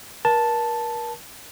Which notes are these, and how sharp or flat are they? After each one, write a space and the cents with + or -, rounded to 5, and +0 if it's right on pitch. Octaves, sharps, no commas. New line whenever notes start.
A#4 +35 A5 +0